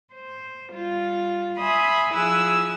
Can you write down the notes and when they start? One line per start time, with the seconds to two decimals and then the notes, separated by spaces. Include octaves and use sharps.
0.13 C5
0.71 G3 F4
1.57 E5 G#5 B5 C6 D#6
2.14 F3 E4 G#4 G#5 E6 F#6